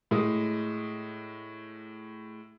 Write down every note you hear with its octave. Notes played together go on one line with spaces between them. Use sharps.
A2 G#3 D#6